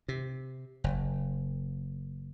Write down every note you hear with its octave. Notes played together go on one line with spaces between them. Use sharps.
C3
F#1